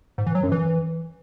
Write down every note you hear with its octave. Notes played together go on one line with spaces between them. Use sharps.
G#2
E3
F#3
F#2
E3